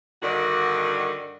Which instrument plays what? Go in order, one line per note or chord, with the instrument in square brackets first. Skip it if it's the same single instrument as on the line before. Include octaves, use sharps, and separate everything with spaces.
[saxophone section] G2 D3 D#3 F#4